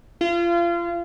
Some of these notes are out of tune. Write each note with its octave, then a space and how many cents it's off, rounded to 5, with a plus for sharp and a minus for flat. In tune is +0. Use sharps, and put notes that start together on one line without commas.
F4 -30